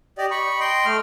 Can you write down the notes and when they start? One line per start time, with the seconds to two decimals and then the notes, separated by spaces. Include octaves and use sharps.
0.18 G4 D5 D#5
0.31 B5 C#6
0.60 D#5 G5 C6
0.86 A3 F6